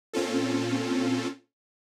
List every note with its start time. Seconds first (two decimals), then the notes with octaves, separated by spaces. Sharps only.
0.13 A#2 C4 C#4 F4 A4